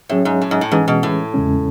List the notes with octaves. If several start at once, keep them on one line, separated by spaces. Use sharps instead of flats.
A2 F#3 C#4 G#4 C#5 E5
G#2
A2
G#2
A2
G#2 E3 G#3 C#4 G#4 B4
B2
A2
E2 C#3 G#3 C#4